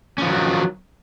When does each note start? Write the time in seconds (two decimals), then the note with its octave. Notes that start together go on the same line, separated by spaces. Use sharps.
0.18 C#4
0.22 F3
0.26 D#3
0.30 F#3